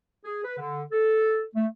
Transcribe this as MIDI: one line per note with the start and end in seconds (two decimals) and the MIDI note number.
0.25 0.42 68
0.45 0.57 71
0.58 0.83 50
0.92 1.43 69
1.55 1.66 57